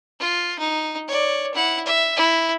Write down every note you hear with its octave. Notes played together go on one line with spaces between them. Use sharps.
F4
D#4
C#5 D5
E4 F#5
E5
E4